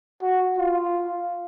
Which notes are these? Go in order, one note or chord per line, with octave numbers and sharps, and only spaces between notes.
F#4
F4